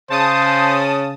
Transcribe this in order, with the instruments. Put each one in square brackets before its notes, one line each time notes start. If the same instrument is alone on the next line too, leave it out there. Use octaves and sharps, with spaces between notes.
[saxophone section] C#3 [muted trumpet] C5 [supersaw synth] A5 D#6